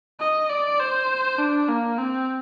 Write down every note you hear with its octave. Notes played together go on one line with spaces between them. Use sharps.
D#5
D5
C5
D4
A#3
C4